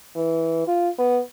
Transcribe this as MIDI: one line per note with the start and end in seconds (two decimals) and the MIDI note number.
0.16 0.62 52
0.68 0.89 65
0.99 1.20 59